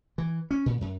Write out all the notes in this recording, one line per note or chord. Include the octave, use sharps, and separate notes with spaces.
E3
C#4
A#2
F#2